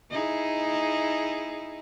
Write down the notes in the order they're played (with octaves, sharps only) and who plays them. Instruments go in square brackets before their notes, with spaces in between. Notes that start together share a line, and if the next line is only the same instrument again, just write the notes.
[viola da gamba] D#4 E4 G#4